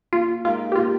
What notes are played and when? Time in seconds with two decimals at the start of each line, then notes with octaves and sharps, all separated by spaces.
0.13 A#2 F4
0.44 G#3 D#4 F4 G4 A#4
0.72 G4
0.76 A#2 F4